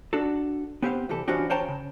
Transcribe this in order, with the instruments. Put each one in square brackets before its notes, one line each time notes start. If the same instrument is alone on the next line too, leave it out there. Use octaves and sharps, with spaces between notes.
[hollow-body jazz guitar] D4 F#4 A4
B3 C4 G4 C5 D#5 F5
C2 E3 G4 A4
E3 F3 C#4 D4 F#4 G4
C5 C#5 F5 G5 A5 A#5
C#3